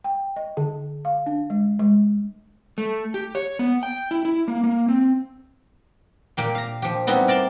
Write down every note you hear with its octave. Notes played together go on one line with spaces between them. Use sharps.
G5
D#5
D3
F5
D4
G#3
G#3
A3
G4
C#5
B3
G5
E4
E4
A#3
A#3
C4
A#2 A#3 G4
F5 A#5
F3 G4
G3 B3 C4 D#4 E4
A#4 D5 A5 C6